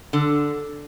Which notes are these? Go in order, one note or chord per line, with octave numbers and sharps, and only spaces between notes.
D3